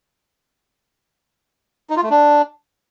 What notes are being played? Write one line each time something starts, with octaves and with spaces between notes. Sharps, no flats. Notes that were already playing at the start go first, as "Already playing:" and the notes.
D#4
F4
A3
D4